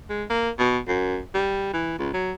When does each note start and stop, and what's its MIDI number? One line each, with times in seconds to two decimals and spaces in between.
0.09 0.24 56
0.30 0.50 58
0.59 0.78 47
0.88 1.19 42
1.34 1.72 55
1.73 1.98 52
1.99 2.13 37
2.14 2.32 54